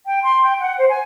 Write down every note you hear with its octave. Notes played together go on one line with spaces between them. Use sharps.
G5
C6
G5
F#5
C5
G#5